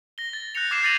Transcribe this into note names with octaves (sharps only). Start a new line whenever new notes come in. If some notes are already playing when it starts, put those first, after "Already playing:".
A#6 G7
A6
F#6 G6 A#6 C#7 F7
D6 F6 G#6 C7 C#7 E7
G6 A6 A#6 C7 D#7 F#7